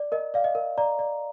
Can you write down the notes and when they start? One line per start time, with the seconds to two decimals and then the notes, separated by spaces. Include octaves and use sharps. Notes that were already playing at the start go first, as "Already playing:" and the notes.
Already playing: D5
0.12 A#4 D#5
0.34 D5 F5
0.44 D#5
0.55 A#4
0.78 D5 A#5
0.99 D5